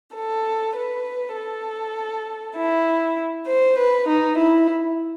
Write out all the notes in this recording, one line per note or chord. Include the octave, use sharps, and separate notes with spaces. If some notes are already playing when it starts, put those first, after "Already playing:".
A4
B4
A4
E4
C5
B4
D#4
E4